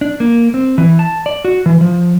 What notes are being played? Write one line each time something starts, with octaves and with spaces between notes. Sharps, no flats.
D4
A#3
C4
E3
A5
D5
F#4
E3
F3